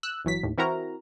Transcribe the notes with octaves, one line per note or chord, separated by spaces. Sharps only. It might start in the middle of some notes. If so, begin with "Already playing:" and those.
E6 F#6
G1 E3 F#3 B6
D#2 A2
E3 C4 E4 F#4 A#4 A#5